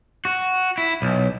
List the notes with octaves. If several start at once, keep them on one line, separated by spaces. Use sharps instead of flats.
F#4
E4
B1